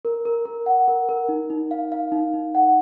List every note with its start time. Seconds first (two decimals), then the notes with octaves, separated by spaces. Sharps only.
0.05 A#4
0.25 A#4
0.45 A#4
0.66 F#5
0.88 A#4
1.09 A#4
1.29 D#4
1.50 D#4
1.71 F5
1.92 F5
2.12 D#4
2.34 D#4
2.55 F#5